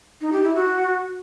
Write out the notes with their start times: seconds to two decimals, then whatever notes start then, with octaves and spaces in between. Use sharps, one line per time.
0.21 D#4
0.32 G4
0.44 E4
0.55 F#4